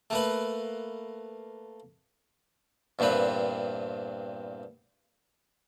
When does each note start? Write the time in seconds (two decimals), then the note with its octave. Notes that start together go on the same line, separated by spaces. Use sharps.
0.10 A3 A#3 B4
2.99 E2 G2 A#2 C4 B4